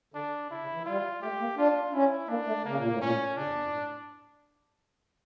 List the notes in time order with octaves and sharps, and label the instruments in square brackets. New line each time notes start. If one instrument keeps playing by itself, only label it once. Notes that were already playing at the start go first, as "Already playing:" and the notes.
[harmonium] D3 [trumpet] D4
[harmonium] C#3 [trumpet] E4
[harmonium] C#3
E3
[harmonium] G3 [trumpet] F4
[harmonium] A3 [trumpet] G4
[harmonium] A#3
[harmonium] D4 [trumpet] F4
[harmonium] C#4 [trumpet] E4
[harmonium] A#3 [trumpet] D4
[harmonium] A3
[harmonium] C#3 [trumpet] A#3
[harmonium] A#2
A2
[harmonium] A#2 [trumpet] C#4
[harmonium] C#3 [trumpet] D4
[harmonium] F2
E2
F2
A2